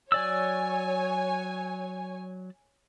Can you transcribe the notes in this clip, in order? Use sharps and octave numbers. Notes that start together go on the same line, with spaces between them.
F#3 C#5 D5 G#5 E6